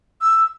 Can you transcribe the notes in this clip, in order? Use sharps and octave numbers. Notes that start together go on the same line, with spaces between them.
E6